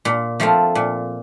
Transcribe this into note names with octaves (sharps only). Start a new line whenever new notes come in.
A#2
F3 A3 C4 F4
A#2